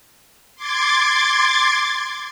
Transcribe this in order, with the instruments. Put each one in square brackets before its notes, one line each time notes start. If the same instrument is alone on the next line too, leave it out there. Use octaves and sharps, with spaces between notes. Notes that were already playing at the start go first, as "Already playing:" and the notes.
[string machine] C6 D6 G#6 A6